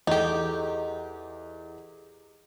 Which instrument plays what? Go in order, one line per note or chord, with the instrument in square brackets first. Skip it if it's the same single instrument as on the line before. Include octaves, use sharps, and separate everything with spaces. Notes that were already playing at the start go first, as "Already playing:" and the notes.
[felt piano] E2 [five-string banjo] D#4 G4 [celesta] A4 D#5